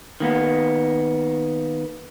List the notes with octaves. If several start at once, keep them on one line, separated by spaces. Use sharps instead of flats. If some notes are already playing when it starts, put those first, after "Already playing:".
D#3 A#3 B3